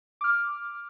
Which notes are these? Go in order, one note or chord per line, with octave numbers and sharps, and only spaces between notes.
D6 F6